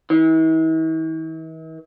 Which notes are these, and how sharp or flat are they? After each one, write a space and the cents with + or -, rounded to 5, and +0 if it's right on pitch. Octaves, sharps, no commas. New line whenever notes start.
E3 -45